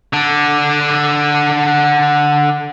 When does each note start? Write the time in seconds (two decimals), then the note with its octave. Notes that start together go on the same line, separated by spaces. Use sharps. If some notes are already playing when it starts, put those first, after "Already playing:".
0.13 D3 D4